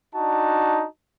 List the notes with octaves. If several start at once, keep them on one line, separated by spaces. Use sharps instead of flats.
D4 D#4 F#4 A5